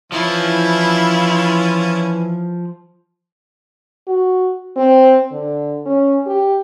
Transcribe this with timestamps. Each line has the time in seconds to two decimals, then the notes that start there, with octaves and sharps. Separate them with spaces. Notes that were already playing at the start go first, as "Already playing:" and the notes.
0.12 E3 F3 C#4 E4 F4
4.07 F#4
4.76 C4
5.32 D3
5.86 C#4
6.26 G4